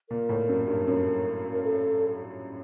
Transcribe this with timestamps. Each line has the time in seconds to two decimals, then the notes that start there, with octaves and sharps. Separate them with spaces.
0.10 A#2 A#4
0.29 A2
0.49 F#2
0.68 G2
0.88 F#2
1.52 A#4
1.65 A4